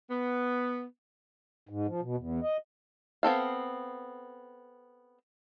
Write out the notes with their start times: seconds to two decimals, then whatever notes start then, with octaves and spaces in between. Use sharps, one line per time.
0.10 B3
1.69 G#2
1.87 F3
2.02 B2
2.16 E2
2.43 D#5
3.23 B3 C4 A4 F5